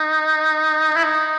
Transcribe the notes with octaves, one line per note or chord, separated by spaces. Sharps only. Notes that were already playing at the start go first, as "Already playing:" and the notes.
Already playing: D#4
E4
D#4